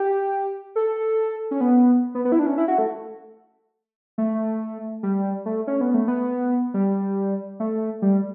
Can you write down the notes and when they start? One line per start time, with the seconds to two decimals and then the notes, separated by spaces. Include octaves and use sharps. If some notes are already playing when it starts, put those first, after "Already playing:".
Already playing: G4
0.76 A4
1.51 C#4
1.61 B3
2.15 B3
2.25 B3
2.32 E4
2.39 D4
2.46 C#4
2.57 E4
2.68 F#4
2.78 A3
4.18 A3
5.03 G3
5.46 A3
5.67 C#4
5.81 B3
5.94 A3
6.08 B3
6.74 G3
7.60 A3
8.02 G3